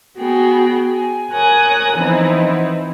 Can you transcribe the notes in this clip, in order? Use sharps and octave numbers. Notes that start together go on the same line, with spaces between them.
B3 F#4 G#4 G5
G#5
A#4 C#5 G#5 D#6 F#6
E3 F3 B3 C4 D#4 E4